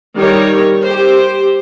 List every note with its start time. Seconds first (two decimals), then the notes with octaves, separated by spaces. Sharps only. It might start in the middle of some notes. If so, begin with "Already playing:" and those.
0.17 D#3 G3 A#4 C#5
0.83 G4 C5